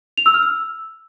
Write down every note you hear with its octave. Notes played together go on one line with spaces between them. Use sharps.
F7
E6
F6
E6